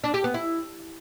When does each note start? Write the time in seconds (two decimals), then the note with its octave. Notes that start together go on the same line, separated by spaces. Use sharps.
0.04 D4
0.14 G4
0.24 B3
0.34 E4